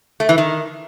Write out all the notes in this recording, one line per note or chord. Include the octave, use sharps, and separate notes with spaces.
A3
E3
D#3